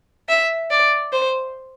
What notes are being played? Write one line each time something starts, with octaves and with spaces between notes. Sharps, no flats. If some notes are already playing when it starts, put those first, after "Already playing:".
E5
D5
C5